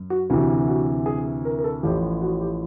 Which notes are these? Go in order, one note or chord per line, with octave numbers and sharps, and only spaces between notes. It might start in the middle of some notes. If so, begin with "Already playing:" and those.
Already playing: F#2
F#4
D2 C3 E3 F#4
F#4
G#4
A#4
A#4
A4
A1 A2 F3 G4
F#4
G4